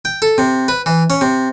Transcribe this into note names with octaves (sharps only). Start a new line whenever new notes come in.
G5
A4
C3
B4
E3
C#4
C3